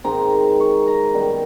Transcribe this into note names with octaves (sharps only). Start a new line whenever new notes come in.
G#2 D#3 G#3 C4 A#5
C#6
A#5
F#2 D#3 G3 B3